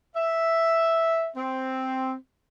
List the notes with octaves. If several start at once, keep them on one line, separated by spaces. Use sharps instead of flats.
E5
C4